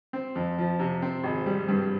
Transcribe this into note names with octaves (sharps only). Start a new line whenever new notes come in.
C4
F2
F3
C3
C4
G#1
G3
G2